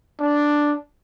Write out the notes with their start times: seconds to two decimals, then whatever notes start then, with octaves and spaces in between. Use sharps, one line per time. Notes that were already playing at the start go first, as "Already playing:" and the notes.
0.19 D4